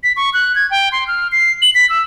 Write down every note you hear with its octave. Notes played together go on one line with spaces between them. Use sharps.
B6
C#6
F#6
G#6
G5
C6
F6
C7
F#7
B6
E6